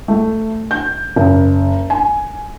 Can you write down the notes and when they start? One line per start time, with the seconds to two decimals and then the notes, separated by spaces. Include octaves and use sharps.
0.08 A3
0.71 G6
1.16 F#1
1.90 G#5